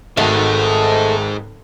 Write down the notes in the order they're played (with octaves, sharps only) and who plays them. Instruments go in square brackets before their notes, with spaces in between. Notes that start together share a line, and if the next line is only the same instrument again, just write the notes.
[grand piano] G#1 F#4 [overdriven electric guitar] G#3 D#4 [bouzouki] A3